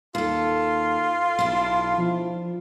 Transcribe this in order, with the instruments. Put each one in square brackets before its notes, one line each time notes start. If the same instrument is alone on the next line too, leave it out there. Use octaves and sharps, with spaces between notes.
[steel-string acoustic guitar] D#2 A4 [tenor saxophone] F4
[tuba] B1 [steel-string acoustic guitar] D4 E4
[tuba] F3